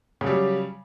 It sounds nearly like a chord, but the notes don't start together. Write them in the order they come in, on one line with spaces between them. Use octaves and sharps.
C#3 F#3 G3